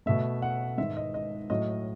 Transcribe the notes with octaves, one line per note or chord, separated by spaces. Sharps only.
B2 A3 E5
F#5
G#2 D#3 G#3 E5
D#5
D#5
A2 F#3 A3 D#5